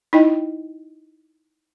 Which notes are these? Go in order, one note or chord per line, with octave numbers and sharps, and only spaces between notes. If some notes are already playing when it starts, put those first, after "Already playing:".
D#4 E4 D#5 G5